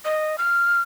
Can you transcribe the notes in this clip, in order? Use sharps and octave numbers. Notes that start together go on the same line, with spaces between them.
D#5
F6